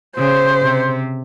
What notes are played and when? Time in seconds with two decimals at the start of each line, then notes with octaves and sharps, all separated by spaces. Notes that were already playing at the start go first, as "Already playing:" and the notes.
0.17 C#3 C5
0.62 C3